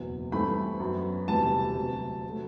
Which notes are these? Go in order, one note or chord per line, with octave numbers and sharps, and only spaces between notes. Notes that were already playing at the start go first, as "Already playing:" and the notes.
Already playing: F#1 E2 B2
G2 E3 A3 C4 B5
F#2 F#3 B3
E1 D2 C3 E3 G3 A5
D2 C3 F#3
F#3 A3